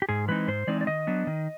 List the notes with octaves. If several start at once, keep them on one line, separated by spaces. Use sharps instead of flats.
G4
G#2 G#4
E3 G#3 C4 D#4 B4
G#2 C5
E3 G#3 C4 D#4 D5
D5
D#3 D#5
F#3 B3 D4
D#3